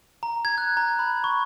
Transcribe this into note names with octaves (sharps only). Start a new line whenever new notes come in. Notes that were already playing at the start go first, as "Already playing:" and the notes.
A#5
G#6
F#6
A#5
B5
C#6